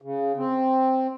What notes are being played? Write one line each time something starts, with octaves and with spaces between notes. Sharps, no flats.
C#3
C4